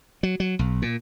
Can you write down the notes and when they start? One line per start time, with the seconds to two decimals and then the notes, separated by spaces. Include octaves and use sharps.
0.23 F#3
0.40 F#3
0.59 B1
0.82 A#2